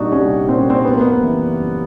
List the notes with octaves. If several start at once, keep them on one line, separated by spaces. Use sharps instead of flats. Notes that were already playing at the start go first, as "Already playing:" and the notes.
Already playing: C2 A#2 G3 D4 D#4 F#4
C2 C#4
A#2 G3 C4
C#4
C4
F#2 B3
A#3
B3
C#3 E3
F#2